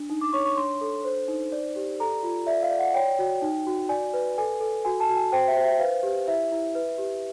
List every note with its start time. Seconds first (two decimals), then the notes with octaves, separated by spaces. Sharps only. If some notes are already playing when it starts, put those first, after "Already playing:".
Already playing: D4
0.10 D#4
0.21 D6
0.33 C#5 C#6
0.45 C#6
0.57 D4 C6
0.81 A4
1.04 C5
1.28 D#4
1.52 D5
1.76 G4
2.00 A4 A#5
2.23 F4
2.47 D5 E5
2.63 F5
2.70 D5
2.79 F#5
2.94 C#5 G5
3.19 F#4
3.42 D#4
3.67 F#4
3.89 D5 G#5
4.14 B4
4.38 A4 G#5
4.60 A4
4.85 F#4 G#5
5.00 A5
5.09 F#4
5.17 G#5
5.32 C5 G5
5.48 E5
5.56 C5
5.64 E5
5.79 B4 F5
6.03 G4
6.27 E4 E5
6.52 E4
6.75 B4
6.98 G4